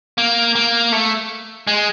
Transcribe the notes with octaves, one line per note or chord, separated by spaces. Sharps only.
A#3
A#3
A3
G#3